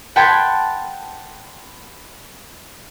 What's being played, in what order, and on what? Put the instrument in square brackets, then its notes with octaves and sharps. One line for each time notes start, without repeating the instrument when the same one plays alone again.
[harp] F#5 G5 A5 B5 C6 G#6